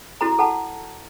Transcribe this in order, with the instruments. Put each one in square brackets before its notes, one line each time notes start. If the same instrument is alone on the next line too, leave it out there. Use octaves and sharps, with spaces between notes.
[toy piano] E4 F#4 A4 A#5
A4 F#5 A5 A#5